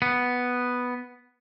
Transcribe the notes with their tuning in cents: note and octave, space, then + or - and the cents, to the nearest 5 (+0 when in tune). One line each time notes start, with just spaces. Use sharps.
B3 +0